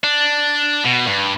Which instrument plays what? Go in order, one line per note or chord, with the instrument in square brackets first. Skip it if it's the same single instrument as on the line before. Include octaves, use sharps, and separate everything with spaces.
[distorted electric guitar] D4
B2
G2